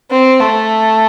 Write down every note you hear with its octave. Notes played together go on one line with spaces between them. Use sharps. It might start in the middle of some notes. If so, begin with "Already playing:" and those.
C4
A3